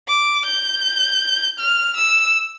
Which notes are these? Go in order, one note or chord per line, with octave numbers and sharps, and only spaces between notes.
D6
G6
F6
E6